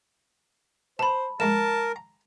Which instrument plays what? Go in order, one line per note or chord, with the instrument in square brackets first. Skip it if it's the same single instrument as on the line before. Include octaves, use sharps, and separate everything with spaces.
[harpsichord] B2 [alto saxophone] C5 [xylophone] A5 B5
[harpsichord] A#1 G#2 G#3 [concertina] A#4 [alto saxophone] A5 [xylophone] E7
[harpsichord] A#5